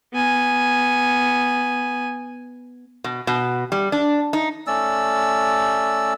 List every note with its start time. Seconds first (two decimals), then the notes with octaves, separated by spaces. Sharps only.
0.13 B3 G#5
3.04 B2
3.27 B2
3.72 G3
3.92 D4
4.33 D#4
4.67 A3 C#4 D5 E6